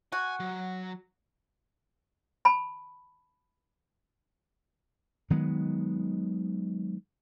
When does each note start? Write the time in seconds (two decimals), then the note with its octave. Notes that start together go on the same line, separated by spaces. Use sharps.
0.12 F#4 G#5
0.40 F#3
2.45 A5 B5
5.30 D#3 F#3 G#3 B3